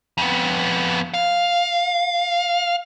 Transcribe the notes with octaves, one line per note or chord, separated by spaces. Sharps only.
F2 B3
F5